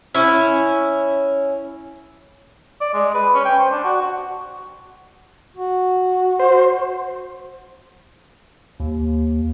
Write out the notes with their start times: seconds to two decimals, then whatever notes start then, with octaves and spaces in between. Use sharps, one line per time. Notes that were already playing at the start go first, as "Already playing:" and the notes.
0.15 C#4 E4
2.81 D5
2.94 G#3
3.14 B4
3.34 C#4
3.45 G5
3.59 C5
3.71 D4
3.84 F#4
4.01 F#4
5.56 F#4
6.40 F#4 C5
8.80 D#2